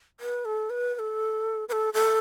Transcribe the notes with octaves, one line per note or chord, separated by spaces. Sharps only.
B4
A4
B4
B4
A4
B4
A4
A4